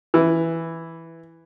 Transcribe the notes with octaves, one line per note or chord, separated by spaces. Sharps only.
E3